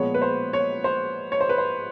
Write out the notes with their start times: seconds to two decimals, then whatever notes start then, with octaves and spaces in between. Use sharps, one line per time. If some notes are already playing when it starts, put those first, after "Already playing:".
Already playing: A#2 F3 G#3 B3 C#5
0.14 B4
0.22 C5
0.53 C#5
0.84 C5
1.32 C#5
1.41 C5
1.49 B4
1.58 C5